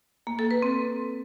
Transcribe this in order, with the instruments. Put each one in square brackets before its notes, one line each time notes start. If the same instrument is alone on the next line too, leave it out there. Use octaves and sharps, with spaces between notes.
[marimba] A#3
A4
B4
C4